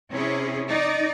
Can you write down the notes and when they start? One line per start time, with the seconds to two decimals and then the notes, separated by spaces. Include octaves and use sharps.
0.10 C3 C#4 E4 G#4
0.68 D#4 D5